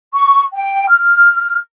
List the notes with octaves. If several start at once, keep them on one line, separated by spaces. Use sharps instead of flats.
C#6
G5
F6